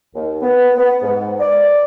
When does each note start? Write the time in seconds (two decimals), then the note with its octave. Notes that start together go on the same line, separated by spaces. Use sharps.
0.15 D#2
0.41 B3
0.78 B3
1.03 G#2
1.40 D5